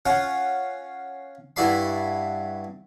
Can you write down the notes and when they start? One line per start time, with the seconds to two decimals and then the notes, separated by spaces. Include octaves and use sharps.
0.05 C#4 F4 F#5
1.56 G2 E4 F#4 D5 B5 C6